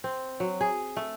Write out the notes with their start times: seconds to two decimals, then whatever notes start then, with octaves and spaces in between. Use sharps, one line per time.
0.04 C4
0.40 F#3
0.61 G#4
0.97 A3